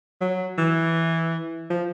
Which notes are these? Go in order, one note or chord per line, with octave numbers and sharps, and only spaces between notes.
F#3
E3
F3